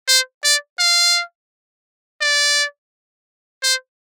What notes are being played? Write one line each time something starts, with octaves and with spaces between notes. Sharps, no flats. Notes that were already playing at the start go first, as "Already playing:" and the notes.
C5
D5
F5
D5
C5